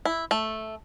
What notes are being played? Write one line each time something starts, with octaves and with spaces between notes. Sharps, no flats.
E4
A3